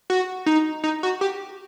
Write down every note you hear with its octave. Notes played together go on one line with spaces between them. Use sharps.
F#4
D#4
D#4
F#4
G4